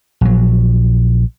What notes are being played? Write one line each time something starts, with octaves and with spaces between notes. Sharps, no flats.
A#1 F#3